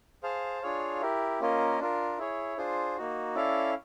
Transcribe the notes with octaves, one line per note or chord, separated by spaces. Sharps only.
G#4 C5 F5 A5
D4 F4 G#4 C#5 F5
E4 G4 A#4
A#3 C#4 F4 A#4 D#5
D4 F4 A#4
E4 G#4 C#5
D4 F4 G#4 C5
A#3 D#4 F#4
C#4 E4 A4 D5 F5